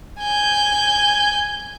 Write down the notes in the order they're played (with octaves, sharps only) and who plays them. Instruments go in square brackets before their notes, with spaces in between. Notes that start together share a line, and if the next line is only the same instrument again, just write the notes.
[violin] G#5 G6